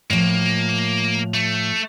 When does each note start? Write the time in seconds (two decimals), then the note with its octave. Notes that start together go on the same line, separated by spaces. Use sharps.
0.10 A2 F3 A#3
1.34 A3